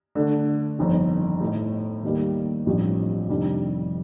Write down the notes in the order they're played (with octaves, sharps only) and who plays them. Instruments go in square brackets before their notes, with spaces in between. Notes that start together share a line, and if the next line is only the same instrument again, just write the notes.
[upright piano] D3 A3 D4
G1 F2 D#3
A2 A3 D#4 A4
D#2 D#3 G3 A#3
A1 G2 F3 C4 G4
F1 F2 D#3 G3 D4